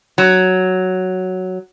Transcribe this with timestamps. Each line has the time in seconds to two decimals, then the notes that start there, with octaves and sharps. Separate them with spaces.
0.18 F#3